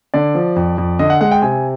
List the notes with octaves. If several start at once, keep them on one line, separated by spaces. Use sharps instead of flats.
D3 D5
F3
F2
F2
D3 D#5
F#5
G#3 F#5
G5
C3 G#5